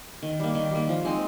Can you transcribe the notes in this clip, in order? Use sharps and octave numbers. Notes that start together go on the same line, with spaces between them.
D#3
G3 A#3
D#3
G3 A#3
F3
G#3 C4 D#4